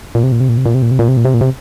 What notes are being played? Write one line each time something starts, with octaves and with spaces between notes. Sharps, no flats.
A#2
C3
A#2
C3
A#2
C3
A#2
C3
A#2
C3
A#2
C3
A#2
C3
A#2
C3